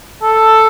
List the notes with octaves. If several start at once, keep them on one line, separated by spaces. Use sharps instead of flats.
A4